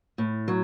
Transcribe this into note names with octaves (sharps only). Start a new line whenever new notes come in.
A2
F#3